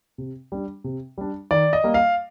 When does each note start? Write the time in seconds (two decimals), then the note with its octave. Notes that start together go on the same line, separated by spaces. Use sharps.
0.18 C3
0.52 G3 D4
0.84 C3
1.18 G3 D4
1.51 D#3 D5
1.73 D#5
1.83 G3 A#3
1.94 F5